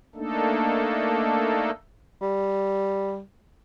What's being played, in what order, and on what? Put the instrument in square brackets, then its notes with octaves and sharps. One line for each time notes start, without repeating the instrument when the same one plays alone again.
[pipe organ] A3 A#3 D4 D#4 A4
[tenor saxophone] G3